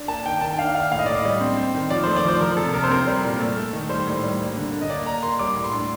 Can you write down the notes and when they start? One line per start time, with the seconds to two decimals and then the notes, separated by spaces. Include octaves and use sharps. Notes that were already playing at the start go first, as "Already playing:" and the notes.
Already playing: D4
0.08 A#3 A5
0.26 D#3 G5
0.41 D#3 A5
0.53 G5
0.58 D4 F5
0.75 D#3 F5
0.91 A2 F5
0.99 D#5
1.06 A2 D5
1.14 D#5
1.25 G3
1.41 C4
1.57 C4
1.74 D#3
1.90 F3 D5
2.03 C5
2.07 A3
2.16 D5
2.25 F3 C5
2.41 F3 A#4
2.57 C3 A4
2.73 C3 A#4
2.84 C5
2.90 C4 A#4
3.07 G3
3.24 A#2
3.40 A3
3.57 A3
3.73 D#3
3.90 G3 C5
4.07 A2
4.23 G3
4.40 A#3
4.57 D3
4.73 D3
4.81 D#5
4.89 A#3 D5
5.06 A#3 A#5
5.23 A#3 C6
5.39 G3 D6
5.56 A2
5.64 C6
5.73 D4